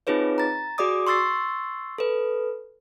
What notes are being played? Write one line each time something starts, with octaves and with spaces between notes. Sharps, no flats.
C4 D#4 F4 G#4 B4 C#5
A#5 A6
F#4 G#4 D5 D6 D#6
C6 C#6 E6 A6 C7
A4 B4